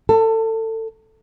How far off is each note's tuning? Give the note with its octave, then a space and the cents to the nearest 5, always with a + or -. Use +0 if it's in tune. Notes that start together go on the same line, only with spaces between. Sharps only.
A4 +25